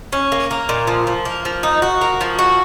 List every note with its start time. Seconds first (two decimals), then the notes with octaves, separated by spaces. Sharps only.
0.12 C#4
0.32 A#3
0.51 A#3
0.69 A#2
0.87 F3
1.07 F3
1.25 A#3
1.45 F3
1.63 D#4
1.82 F#4
2.01 A#3
2.21 F3
2.39 F#4